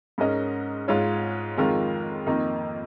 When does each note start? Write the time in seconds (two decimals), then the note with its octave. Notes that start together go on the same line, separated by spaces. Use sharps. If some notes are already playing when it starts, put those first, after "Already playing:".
0.18 G#2 G#3 C#4 A#4 D#5
0.88 G#2 G#3 F4 C#5
1.57 F2 D#3 G#3 F4 A#4
2.26 F2 D#3 A#3 D#4